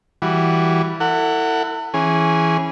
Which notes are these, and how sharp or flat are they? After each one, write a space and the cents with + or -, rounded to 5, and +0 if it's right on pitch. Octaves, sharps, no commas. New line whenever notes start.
E3 +0 G3 +0 F#4 +0
E4 +0 A4 +40 F#5 +0
E3 +0 C#4 -15 G#4 +0